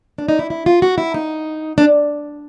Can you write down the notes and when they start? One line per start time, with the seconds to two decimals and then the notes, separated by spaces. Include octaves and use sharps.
0.18 D4
0.28 D#4
0.39 E4
0.50 E4
0.66 F4
0.82 F#4
0.98 E4
1.14 D#4
1.78 D4